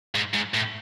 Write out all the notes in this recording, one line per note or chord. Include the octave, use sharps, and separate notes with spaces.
G#2
G#2
A2